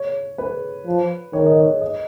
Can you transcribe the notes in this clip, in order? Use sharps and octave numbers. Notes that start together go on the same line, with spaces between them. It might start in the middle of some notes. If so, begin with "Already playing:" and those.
Already playing: C#5
B4
F3
D#3 C#5
D#5
C#5
D#5